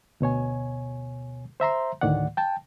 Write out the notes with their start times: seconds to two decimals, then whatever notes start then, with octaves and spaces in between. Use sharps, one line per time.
0.20 D2 B2 C#5 G#5
1.60 C5 E5 A#5 C6
2.01 D2 A2 D#3 D5 F#5
2.37 G5 A5